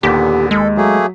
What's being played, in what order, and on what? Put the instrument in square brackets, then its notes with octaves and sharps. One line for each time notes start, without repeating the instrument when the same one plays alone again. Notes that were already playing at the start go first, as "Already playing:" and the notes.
[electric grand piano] D#2 B6 [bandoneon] A#2 D3 B3 [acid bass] G4
[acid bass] G#3 [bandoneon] A4
[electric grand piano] F#3 [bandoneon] A3 A#3 G#4